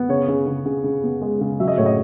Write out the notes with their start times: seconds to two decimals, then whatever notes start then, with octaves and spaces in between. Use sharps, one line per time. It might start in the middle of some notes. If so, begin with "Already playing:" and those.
Already playing: B3
0.09 C#3 C#5
0.28 C#3
0.46 C#3
0.66 C#3
0.84 C#3
1.04 B3
1.21 G#3
1.41 C#3
1.60 F#3 E5
1.68 D#5
1.78 A2 C#5
1.86 D#5